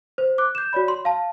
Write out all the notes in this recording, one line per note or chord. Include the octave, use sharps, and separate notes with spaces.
C5
D6 F#6
G6 E7
F#4 C#5 D5 B5
C6
F5 A5